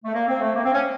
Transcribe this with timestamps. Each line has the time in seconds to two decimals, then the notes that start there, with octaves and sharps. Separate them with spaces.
0.05 A3
0.14 A#3
0.28 C4
0.41 A3
0.54 A#3
0.64 C4
0.74 C#4